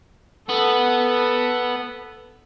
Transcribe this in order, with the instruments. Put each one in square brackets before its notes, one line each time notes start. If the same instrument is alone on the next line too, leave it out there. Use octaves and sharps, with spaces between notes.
[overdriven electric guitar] B3 [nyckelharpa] A4